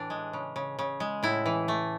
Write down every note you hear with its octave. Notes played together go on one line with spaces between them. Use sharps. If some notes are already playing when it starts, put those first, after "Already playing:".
Already playing: A2 E3 D4
G#3
C#3
C#3
C#3
G#3
A2 E4
E3
A3